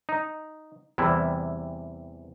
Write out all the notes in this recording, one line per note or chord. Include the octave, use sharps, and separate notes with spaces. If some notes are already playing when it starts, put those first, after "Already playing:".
D#4
E2 C3 E3 G3 E4